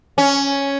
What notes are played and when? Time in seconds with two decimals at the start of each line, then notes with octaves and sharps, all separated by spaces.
0.18 C#4